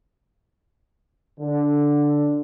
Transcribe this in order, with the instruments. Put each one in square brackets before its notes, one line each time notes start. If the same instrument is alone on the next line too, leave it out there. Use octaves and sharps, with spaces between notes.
[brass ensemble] D3